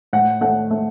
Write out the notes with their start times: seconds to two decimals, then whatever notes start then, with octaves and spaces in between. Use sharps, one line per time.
0.13 A2 F#5
0.41 A3 F#5
0.71 A3